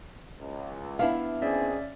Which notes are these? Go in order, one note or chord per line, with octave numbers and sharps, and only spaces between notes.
C#2
B3 D4 E4 F5
G#1 C4 C#4 G#4 D5 E5